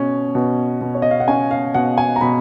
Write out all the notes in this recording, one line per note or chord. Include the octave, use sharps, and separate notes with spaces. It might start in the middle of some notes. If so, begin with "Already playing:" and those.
Already playing: B2 C#4
B2
B2
C#5
D#5
F5
F#5
C#4 G#5
F5
B2 F#5
G#5
A#5
B2 B5